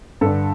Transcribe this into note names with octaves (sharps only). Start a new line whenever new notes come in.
G2 D3 A4